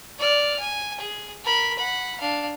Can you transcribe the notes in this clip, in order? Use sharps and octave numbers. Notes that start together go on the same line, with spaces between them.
D5 F6
G#5
G#4
A#4 B5
F#5 B5
D4 F5